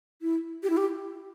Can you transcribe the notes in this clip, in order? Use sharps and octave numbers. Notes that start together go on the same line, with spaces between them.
E4
G4
E4
G4